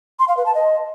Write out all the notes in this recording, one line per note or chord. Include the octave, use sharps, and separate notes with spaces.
C6
F5
B4
A5
D#5